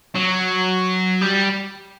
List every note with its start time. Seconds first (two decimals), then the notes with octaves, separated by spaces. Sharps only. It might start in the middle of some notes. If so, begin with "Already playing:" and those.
0.15 F#3
1.21 G3